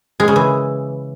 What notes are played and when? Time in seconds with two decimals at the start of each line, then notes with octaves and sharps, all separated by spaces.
0.20 G#3
0.28 C#3
0.36 E3